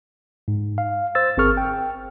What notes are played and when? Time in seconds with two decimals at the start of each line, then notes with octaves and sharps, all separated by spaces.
0.48 G#2
0.78 F5
1.15 C5 E6 A6
1.37 G1 C4 G#4 A#4 C#6 F6
1.57 G5